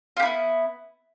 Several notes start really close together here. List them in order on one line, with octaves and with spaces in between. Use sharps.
F4 G4 E4 B3